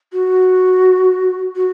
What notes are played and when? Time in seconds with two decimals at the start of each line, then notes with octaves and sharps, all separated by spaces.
0.13 F#4
1.56 F#4